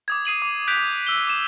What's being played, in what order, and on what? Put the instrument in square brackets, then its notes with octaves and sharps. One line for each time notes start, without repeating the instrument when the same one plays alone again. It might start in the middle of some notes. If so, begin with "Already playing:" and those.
[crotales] D6 D#6 G#6
D#6 C7 D#7 F#7
D6
F#6 G6 B6 D7 F7
E6 G7
D6 E7